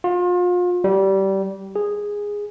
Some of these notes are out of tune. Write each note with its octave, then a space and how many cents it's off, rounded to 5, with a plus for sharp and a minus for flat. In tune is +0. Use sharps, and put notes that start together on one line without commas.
F4 +35
G3 -20
G#4 -10